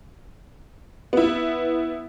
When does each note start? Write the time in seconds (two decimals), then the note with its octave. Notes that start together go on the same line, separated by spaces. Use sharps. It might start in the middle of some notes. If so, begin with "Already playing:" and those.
1.13 B3 E4